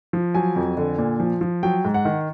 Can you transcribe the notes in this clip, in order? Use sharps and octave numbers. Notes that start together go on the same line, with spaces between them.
F3
F#3 G#5
F2
D3
A#2
F3
F3
F#3 G5
G#2
F#5
D#3